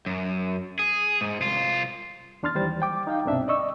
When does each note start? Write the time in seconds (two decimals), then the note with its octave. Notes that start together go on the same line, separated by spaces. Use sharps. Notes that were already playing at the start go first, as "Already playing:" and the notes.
0.06 F#2
0.79 G#4
1.21 G#2
1.41 C2 F4
2.43 E2 D4 C6 F6 A6
2.55 D#2 E3 G3 C5 A6
2.82 G5 D6
3.07 D#4 F5 G5
3.25 C2 G2 B2 C4 D4 E5
3.48 D5 D#5 C#6 E6